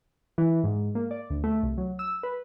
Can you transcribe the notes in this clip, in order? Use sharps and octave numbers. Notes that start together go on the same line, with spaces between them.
E3
G#2
A#3
D5
D2
A3
C2
F#3
E6
B4